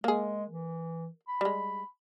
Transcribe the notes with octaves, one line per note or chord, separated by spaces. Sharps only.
G#3 A#3 G#4
E3
B5
G3 G#3